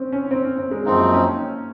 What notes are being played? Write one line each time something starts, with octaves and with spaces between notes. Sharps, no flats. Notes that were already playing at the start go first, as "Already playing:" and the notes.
Already playing: C4 C#4
C#4
C4
C#4
C4
G#3
F#2 F3 A#3 C4 D#4
C#4